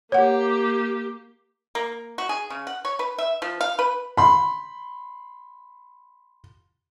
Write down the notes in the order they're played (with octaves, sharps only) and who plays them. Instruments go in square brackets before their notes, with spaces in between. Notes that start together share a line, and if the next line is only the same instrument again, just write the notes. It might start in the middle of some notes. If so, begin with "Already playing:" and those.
[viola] A#3 G4 [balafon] C#5 F#5
[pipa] A#3
F#4
G#4
C#3
F#5
C#5
B4
E5
F3
F5
B4
[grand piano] B5 C6